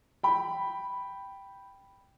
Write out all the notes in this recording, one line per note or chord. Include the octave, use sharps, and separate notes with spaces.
G5 B5